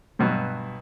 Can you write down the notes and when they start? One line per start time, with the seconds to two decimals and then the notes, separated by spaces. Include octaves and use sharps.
0.19 G2 B2 F#3